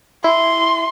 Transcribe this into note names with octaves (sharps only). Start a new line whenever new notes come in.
E4 C6